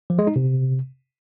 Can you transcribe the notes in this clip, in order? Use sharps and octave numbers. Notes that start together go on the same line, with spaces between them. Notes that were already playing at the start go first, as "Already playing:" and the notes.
F3
G#3
D#4
C3